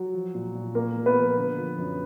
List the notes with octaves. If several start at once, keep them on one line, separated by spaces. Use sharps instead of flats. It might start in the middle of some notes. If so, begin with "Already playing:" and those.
Already playing: F#3 F#4
F3
A#2
A#2
A#2 A#3 A#4
A#2
B3 B4
F3
D3
F3
F#2